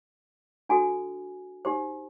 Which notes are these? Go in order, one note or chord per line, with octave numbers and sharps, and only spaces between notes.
D4 F#4 A4 G#5
D#4 G4 C5